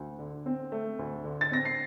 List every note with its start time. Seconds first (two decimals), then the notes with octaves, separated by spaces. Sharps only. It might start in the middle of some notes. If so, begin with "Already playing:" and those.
Already playing: D2
0.19 D3
0.46 C4
0.72 A3
0.99 D2
1.24 D3
1.41 A6
1.52 C4 A#6
1.65 C7